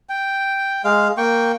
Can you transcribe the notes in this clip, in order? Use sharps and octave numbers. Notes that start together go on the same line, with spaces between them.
G5
G#3 F5
A#3 G5 C#6